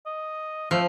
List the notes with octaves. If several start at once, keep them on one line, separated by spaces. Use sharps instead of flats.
D#5
F3 A3